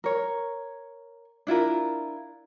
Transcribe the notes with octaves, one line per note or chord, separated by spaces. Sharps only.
A#4 C#5
D4 E4 F4 A#4